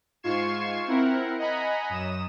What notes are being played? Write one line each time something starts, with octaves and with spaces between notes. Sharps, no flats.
G#2 F4 C#6 G#6 C7 E7
C4 E4 A#4 F#5
D#5 F#5 G#5 A#5 B5
F#2 D#6 E7